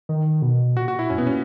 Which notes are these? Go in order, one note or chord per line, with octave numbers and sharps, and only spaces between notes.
D#3
B2
A#2 F#4
F#4
E4
F#2 C#4
B2 B3
A#2 C#4